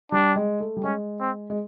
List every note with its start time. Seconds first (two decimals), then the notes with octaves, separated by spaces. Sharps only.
0.11 G3 D4
0.36 G#3
0.60 A3
0.77 G3
0.84 G#3 C#4
1.20 C4
1.50 G#3